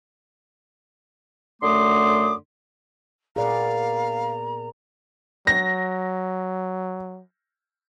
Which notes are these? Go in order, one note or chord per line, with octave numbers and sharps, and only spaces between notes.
F#2 D3 A3 C6 D6 D#6
A#2 B3 G#4 D5 F5 A#5
F#3 A#6